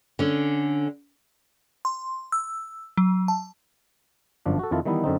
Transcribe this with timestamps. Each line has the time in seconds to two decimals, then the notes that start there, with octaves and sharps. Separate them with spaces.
0.19 D3 C#4
1.85 C6
2.32 E6
2.97 F#3
3.28 A5
4.46 G1 F#2 F3 D4
4.59 F#4 A4
4.71 F2 D#3 E4 F4 A5
4.86 D#3 E3 G3 B3 D#4 E4
5.04 F#2 D3 C4 D#4